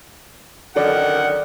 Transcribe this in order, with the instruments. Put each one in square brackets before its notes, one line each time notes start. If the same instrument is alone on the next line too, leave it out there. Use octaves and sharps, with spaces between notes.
[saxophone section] F#2 D3 D#3 [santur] D5 [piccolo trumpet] F#5